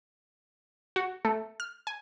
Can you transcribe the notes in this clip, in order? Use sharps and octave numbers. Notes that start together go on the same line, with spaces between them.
F#4
A3
F6
G#5